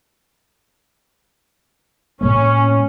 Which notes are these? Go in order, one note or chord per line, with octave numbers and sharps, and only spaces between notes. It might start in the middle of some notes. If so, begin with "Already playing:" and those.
A2 G#3 A#3 C#4